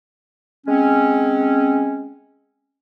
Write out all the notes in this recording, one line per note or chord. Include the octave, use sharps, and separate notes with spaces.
G#3 C4 C#4